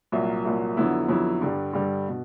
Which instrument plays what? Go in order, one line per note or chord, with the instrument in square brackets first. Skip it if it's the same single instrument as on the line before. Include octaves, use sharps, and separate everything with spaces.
[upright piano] C2 A#2 F#3
C2 A#2 F#3
F2 D3 F#3 B3 E4
F2 D3 F#3 B3 E4
G2 D3 G3
G2 D3 G3
B2